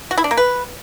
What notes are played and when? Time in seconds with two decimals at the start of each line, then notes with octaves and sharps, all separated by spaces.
0.11 F#4
0.18 E4
0.24 D4
0.31 A#3
0.37 B4